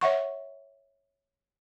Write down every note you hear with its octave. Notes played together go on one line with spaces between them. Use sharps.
C#5 E5 F#5 C#6